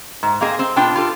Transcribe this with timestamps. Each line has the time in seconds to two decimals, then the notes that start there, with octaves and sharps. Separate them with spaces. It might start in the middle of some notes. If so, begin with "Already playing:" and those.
0.23 G#2
0.41 A#3 C4 G#4 D#5
0.59 C4
0.76 B2 D4 F4 G5
0.96 F4 G4 A4